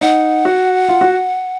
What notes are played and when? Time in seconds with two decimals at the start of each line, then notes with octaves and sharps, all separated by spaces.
0.01 D#4 F#5
0.45 F#4
0.89 F4
1.01 F#4